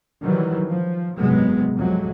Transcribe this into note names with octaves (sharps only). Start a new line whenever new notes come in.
D#3 E3 F#3 G3
F3
F#1 G#2 C3 F#3 G#3 B3
C2 F2 C3 F#3 G#3